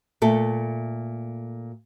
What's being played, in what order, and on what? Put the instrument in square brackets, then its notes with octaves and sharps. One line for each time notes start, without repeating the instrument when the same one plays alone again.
[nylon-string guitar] A#2 A3 A4